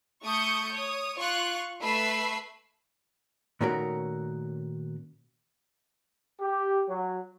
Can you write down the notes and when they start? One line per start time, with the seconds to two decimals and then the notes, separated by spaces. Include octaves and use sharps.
0.23 A3 C#6 D#6 G6 C#7
0.72 C#5 D#6
1.17 F4 C#6 F#6
1.81 A3 B4 E5 B5 C7
3.61 A#2 D#3 A3 C#4 F#4 A#4
6.41 G4
6.89 F#3